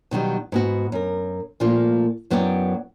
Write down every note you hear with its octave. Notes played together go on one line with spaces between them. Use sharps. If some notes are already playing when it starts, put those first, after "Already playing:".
B2 D#3 F#3 G3
G#2 B3 F#4
F#2 A#4
A#2 F3 A3 A#3 F4
F#2 F#3 B3 E4 D5 G5